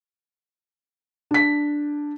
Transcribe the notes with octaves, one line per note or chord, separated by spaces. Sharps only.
D4 B6